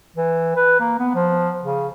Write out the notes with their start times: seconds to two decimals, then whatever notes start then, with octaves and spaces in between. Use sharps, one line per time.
0.16 E3
0.56 B4
0.80 A#3
0.99 B3
1.15 F3
1.63 C#3